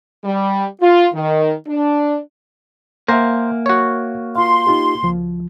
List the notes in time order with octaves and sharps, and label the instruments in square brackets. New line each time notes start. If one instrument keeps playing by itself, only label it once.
[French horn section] G3
F4
D#3
D4
[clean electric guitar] A#3 [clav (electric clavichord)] C5 A#5 [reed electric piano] E5 F#5 G#5
[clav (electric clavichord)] F#4 C#5
[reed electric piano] F4 F5 [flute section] C6
[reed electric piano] D#4 F4 G4
C#2 F3